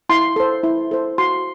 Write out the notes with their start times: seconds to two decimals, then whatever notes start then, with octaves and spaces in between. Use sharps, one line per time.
0.09 E4 C6
0.36 A4 C5
0.63 E4
0.91 A4 C5
1.18 F#4 C6